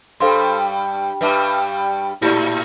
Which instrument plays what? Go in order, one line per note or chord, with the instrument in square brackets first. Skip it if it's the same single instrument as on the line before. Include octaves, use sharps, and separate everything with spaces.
[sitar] G2 G3 [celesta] A4 C5 F5 C6
[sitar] G2 G3 [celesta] B4 E5 A5 D6
[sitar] A2 A3 [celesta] E4 G4 D5